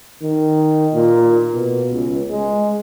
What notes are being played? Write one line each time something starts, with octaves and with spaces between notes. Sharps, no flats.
D#3
A#2
B2
C#2
G#3